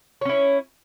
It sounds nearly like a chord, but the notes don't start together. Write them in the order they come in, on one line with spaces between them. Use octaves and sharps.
C#5 C#4 E4